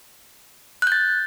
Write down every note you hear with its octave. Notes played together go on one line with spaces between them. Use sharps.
F#6 G6 A6